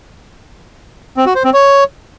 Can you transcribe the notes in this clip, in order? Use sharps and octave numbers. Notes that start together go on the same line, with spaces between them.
C4
F#4
C5
C4
C#5